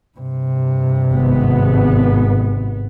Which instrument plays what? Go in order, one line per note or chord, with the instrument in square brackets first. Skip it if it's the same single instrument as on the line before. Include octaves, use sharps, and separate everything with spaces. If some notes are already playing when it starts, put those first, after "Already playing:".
[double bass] G2 C3
[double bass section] G#1 B3